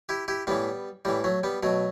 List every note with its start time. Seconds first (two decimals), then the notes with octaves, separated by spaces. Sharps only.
0.09 E4 G4
0.28 E4 G4
0.47 A2 E3 G3 B3
1.05 A2 E3 G3
1.24 F#3 A3
1.44 G3 B3
1.63 B2 F#3 A3